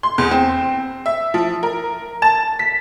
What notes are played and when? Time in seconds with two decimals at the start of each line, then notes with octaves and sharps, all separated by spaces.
0.03 C6
0.18 E2
0.31 C4
1.06 E5
1.34 F3
1.63 A#4
2.22 A5
2.59 B6